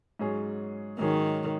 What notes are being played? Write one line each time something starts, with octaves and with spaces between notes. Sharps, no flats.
G#2 F#3 C#4 G#4
G#2 D#3 F#3 C#4 G#4